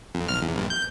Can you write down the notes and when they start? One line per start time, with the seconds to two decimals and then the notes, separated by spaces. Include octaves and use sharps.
0.15 F2
0.28 B1 F6
0.42 E2
0.55 A#1 G2
0.70 G6